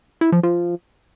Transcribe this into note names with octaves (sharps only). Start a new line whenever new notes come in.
E4
F3
F3